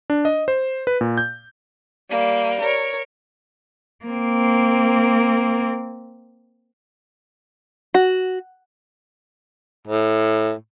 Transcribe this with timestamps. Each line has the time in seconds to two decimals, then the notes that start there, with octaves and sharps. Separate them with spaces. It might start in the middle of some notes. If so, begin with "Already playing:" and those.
0.10 D4
0.25 D#5
0.48 C5
0.87 B4
1.01 A#2
1.17 G6
2.09 G3 A#3
2.60 A#4 C#5
4.05 A#3 C4
7.94 F#4
9.87 A2